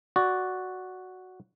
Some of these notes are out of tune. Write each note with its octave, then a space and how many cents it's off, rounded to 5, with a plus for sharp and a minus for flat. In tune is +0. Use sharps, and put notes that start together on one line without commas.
F#4 +0 D5 -5